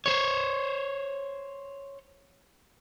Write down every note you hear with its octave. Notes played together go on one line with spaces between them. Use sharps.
C5 C#5